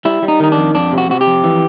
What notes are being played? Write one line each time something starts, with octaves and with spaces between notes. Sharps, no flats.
G3 E4
G3
D#4
D#3 D#4
D4
F2
F2 D4
C3
F#4
C3 F#4
G4
F2
E3